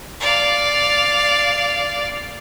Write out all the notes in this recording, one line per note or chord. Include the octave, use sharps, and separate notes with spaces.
D5 F5